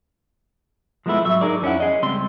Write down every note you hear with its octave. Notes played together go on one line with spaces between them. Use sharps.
F3 G#3 A3 B3 E4
G#2 F#3 E5
D#4 G#4 A#4 D5
F2 C#4 E4 F#5
G#4 D#5
C#2 G3 C4 C6